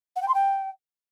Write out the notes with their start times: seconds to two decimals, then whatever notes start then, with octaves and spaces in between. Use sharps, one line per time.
0.16 F#5
0.22 G5
0.28 C6
0.34 G5